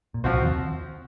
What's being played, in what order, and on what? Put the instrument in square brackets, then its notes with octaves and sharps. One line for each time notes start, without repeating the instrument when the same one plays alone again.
[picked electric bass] A#2
[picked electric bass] C2 C3 [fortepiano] F3 C4 F#4 C5
[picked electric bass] D#2 D#3